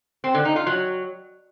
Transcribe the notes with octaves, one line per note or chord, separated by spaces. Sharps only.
C4
D3
D#4
F4
F#3